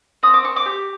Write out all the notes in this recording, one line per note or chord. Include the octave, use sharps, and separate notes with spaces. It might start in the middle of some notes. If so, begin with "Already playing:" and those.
C4 D#6
D6
C4 C#6
D6
G4